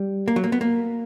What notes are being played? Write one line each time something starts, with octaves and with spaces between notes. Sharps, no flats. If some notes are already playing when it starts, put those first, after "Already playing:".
Already playing: G3
A#3
F#3
A#3
B3
A#3